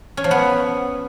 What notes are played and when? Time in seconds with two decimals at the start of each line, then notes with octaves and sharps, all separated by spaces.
0.17 C#4
0.24 F3
0.31 B3